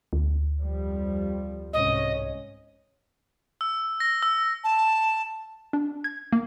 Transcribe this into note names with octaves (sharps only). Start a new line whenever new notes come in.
D2
F2 F3 G3
C2 G#2 C#4 D#5
E6
A#6
E6
A5
D4
G#6
A#3